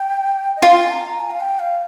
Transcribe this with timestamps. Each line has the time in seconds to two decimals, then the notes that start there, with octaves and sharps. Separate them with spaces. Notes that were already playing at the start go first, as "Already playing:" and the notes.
Already playing: G5
0.57 D#5
0.62 F4 F5
0.73 G5
0.83 G#5
0.91 A#5
1.20 G#5
1.31 F5
1.40 G5
1.59 F5